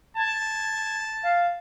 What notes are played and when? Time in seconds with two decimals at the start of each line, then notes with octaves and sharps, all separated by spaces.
0.17 A5 G#6
1.23 F5